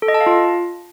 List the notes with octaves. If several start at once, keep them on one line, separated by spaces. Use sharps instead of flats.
A4
D#5
A5
F5
F4